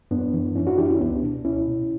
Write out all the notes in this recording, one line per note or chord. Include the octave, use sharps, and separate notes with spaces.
F#2 B3 D4
E3
F#2 C#4 E4
D4 F#4
E3 E4 G4
C#4 E4
C#2 B3 D4
B2
C#2 C#4 E4
B2